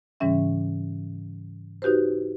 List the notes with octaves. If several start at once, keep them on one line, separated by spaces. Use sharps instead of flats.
G#2 C#3 E3 G3 C#4 E5
D#4 F#4 G4 B4 C5